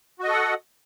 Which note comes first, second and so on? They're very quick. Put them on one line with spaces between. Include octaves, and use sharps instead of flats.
F#4 D#5 A4 F#5